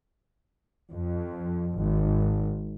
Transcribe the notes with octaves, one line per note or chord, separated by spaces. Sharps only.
F2
G#1